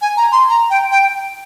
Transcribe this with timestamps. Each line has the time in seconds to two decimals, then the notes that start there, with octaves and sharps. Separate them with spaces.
0.02 G#5
0.17 A#5
0.32 C6
0.49 A#5
0.70 G5
0.91 G5